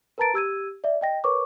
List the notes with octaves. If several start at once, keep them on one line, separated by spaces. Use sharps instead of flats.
A#4 B4 A5 A#5 A6 D7
G4 E6 G#6 D#7
D5 E5
D#5 G5 A#6
A#4 B4 C#5 C#6 D6